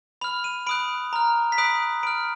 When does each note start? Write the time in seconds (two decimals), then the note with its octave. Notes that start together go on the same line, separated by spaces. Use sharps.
0.21 B5 F6 F7
0.44 D#7
0.67 B5 D#6 F#6 D7
1.13 A#5 F6
1.52 B6
1.58 B5 D#6 F#6 D7
2.03 B5 F6 D7